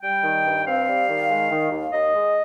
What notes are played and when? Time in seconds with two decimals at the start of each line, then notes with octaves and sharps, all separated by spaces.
0.02 G3 G5
0.23 D#3
0.45 G2
0.66 C4 F5
0.87 G3
1.08 D#3
1.30 G#3
1.50 D#3
1.71 D#2
1.92 D#2 D#5
2.14 G#3